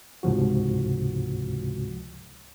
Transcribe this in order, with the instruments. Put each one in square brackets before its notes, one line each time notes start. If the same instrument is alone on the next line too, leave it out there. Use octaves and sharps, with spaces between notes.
[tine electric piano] C#2 G#2 C3 F3 F#4